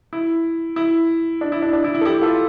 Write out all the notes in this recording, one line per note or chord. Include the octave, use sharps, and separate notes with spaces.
E4
E4
D4
E4
D4
D4
E4
E4
A4
E4 G4
F4 A4